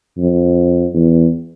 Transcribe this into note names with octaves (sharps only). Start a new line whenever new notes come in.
F2
E2